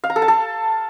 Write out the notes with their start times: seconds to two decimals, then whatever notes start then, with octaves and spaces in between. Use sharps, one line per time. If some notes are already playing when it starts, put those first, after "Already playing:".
0.04 F5
0.10 A#5
0.16 A4
0.22 A5
0.28 A4